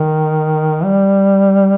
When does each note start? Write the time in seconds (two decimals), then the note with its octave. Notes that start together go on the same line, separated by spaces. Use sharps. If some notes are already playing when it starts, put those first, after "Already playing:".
Already playing: D#3
0.84 G3